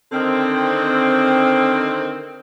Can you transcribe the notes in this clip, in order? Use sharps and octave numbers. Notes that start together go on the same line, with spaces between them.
D3 D#3 C4